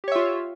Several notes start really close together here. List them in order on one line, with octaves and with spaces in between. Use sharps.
G4 C#5 E5 F4